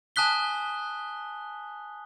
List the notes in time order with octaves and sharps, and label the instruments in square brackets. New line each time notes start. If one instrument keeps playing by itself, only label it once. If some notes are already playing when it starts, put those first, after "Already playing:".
[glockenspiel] G#5 A5 D#6 F#6 B6 G7